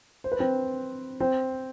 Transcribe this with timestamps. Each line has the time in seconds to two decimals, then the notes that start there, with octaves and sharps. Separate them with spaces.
0.24 C5
0.32 B4
0.39 C4 C5
1.20 C4 C5